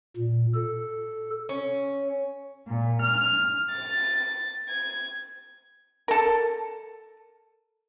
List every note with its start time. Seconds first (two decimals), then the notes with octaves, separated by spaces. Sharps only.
0.16 A#2
0.55 A4
1.49 C#4
2.67 A#2
3.02 F6
3.70 A6
4.69 G#6
6.08 A4 A#4